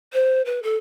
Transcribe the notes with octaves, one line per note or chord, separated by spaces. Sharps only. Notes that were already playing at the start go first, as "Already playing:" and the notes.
C5
B4
A4